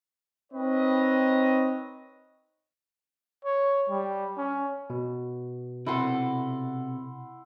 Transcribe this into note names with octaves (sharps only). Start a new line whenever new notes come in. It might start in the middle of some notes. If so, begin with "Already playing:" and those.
C4 D#4 B4 C#5 D#5
C#5
G3
C#4
B2
C3 E4 A4 F#5 C6